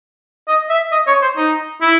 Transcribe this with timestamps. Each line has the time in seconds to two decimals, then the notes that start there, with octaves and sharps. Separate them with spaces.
0.48 D#5
0.70 E5
0.92 D#5
1.07 C#5
1.22 C5
1.37 D#4
1.82 E4